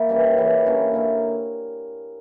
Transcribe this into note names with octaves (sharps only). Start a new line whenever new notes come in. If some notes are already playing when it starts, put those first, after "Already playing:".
Already playing: A#3 E4
C#3 E3 G3
C#3 E3 G3
D3 A#3 C#4 E4
D3 A#3 C#4 E4